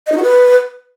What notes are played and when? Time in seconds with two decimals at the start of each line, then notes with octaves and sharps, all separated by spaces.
0.07 D#5
0.12 D#4
0.17 F#4
0.23 B4